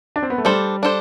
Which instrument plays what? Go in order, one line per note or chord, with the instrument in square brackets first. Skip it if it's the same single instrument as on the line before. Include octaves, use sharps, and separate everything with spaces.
[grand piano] D4
C4
B3
A3
[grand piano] G3 [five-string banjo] D4 A4 C5
[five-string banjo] D4 A4 C5